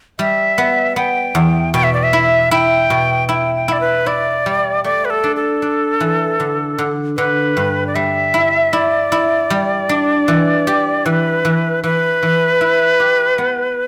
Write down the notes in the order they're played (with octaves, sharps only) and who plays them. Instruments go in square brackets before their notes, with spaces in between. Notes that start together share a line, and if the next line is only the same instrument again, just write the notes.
[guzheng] G3 [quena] E5
[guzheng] B3
[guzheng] B3 [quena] G5
[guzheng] E2
[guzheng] B2 [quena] G5
[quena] E5
D5
E5
[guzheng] E4
[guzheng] E4 [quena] G5
[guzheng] B2
[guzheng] E4 [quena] G5
[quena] G5
[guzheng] E4 [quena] D5
[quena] B4
[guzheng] E4 [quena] D5
[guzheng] G3
[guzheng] A3 [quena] D5
[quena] B4
A4
[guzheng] D4
[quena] A4
[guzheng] D4
E3
D3
D3
[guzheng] D3 [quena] B4
[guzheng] G2
[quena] D5
[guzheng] G3 [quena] E5
[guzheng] E4
[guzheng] E4 [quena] D5
[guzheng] E4
G3
D4
E3
G4
[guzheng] E3 [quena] B4
[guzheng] E3
[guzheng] E3 [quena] B4
[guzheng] E3
E4
G4
B3